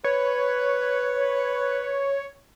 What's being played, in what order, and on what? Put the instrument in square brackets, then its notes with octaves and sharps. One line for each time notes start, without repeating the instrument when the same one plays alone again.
[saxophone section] B4 [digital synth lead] C#5